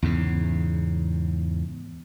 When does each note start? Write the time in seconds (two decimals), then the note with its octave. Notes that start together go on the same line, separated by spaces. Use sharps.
0.02 E2 G#2 C#3